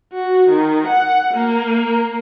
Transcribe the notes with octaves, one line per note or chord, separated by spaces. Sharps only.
F#4
D#3
F#5
A#3